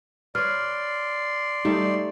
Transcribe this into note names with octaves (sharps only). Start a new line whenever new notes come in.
B4 C#5 D5 C6 F6
G3 A3 D#4